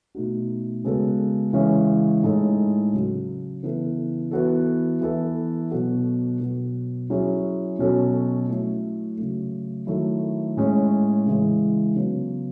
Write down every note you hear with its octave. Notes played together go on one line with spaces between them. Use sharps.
B2 A3 D#4 F#4
C#3 G#3 B3 F#4 A4
C#3 E3 G#3 C#4
A2 G#3 D#4 A4
C#3 F#3 C#4 F#4
C#3 E3 B3 E4 A4
E3 B3 F#4 A4
E3 B3 E4 A4
B2 F#3 B3 F#4 A4
B2 F#3 B3
F#3 C#4 E4 G#4
B2 F#3 C#4 F#4 A4
F#3 A3 E4
C#3 F#3 A3
D#3 F#3 A3 E4 A4
A2 G#3 C#4
C#3 E3 G#3
C#3 F#3 B3